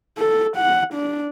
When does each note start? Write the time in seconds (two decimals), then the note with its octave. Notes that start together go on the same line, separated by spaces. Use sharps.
0.18 A4
0.57 F#5
0.94 D4